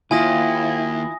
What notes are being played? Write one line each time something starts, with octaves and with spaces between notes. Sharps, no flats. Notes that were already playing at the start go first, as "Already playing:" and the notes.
D#2 E4 F4 G#5 D#6 A#6